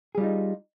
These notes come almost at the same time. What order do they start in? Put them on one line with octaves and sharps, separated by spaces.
G#4 G3 F4 D#4